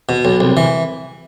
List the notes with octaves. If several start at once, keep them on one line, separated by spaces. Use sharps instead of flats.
B2
B1
C2
E3